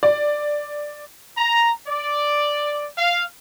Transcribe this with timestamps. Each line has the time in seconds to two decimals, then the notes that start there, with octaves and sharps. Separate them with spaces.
0.03 D5
1.38 A#5
1.88 D5
2.98 F5